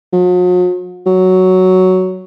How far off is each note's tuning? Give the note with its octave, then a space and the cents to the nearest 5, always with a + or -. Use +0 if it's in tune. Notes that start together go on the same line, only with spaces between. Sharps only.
F#3 -45
F#3 +5